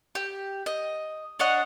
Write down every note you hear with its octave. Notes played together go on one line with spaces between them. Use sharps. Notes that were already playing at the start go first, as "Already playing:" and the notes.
G4
D#5
D4 C#5 D#5 F#5